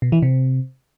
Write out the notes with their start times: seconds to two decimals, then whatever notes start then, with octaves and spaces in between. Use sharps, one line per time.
0.02 B2
0.12 E3
0.22 C3